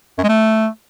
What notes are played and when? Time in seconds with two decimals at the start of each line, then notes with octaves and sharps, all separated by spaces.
0.18 F#2
0.24 G#3
0.29 A3